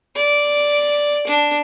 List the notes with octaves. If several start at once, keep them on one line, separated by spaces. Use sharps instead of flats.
D5
D4